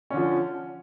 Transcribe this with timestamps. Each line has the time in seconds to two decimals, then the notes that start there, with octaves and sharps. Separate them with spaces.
0.10 C#4
0.14 D3
0.17 F3